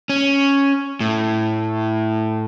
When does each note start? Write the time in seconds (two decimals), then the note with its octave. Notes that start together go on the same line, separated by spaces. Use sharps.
0.10 C#4
1.00 A2